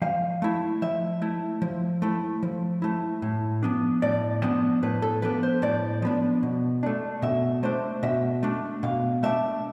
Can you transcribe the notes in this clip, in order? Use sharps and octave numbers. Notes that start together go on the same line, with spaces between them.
F3 F5
A3 E4
F3 E5
A3 E4
F3
A3 E4
F3
A3 E4
A2
F3 B3 D4
A2 D5
F3 B3 D4
A2 B4
A4
F3 B3 D4 B4
C5
A2 D5
F3 B3 D4
B2
A3 D4
B2 E5
A3 D4 C5
B2 E5
A3 D4
B2 F5
A3 D4 E5